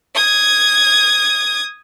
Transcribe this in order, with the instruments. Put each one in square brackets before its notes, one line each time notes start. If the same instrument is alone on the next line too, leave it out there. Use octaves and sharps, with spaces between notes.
[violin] D#6 G#6